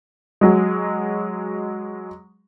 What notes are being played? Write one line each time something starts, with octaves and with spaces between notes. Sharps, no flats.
F#3 G#3